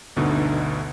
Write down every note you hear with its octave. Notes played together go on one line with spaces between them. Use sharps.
G1 D2 B2 D3 D#4